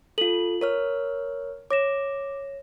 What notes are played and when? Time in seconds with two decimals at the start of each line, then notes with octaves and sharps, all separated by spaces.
0.18 F4 A4 F#7
0.61 A#4 C#5 F6
1.71 C#5 D6 A#6 E7